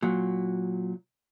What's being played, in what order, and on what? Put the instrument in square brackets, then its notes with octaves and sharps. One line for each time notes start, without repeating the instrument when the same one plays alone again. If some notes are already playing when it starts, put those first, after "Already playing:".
[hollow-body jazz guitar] A#2 F#3